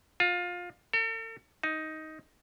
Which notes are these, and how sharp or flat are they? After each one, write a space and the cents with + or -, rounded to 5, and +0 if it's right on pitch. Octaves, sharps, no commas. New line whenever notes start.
F4 +20
A4 +45
D#4 +10